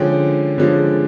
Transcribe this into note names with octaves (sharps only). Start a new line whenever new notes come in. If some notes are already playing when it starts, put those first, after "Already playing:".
Already playing: D3 F3 G#3 C#4 G5
D3 F3 G#3 C#4